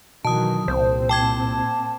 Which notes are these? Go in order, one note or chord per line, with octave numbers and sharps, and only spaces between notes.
B2 D#3 E3 F#3 A5 D#6
C2 A#2 C4 C5
G5 A5 D6 G#6